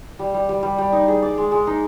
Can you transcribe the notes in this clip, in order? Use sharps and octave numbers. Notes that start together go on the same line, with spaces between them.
G3
G3
G3
G3
G3
D#4
G#4
D5
G#3
G#3
D#4